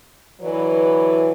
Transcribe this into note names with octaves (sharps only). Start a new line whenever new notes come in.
D3 E3 F#3 B4 D5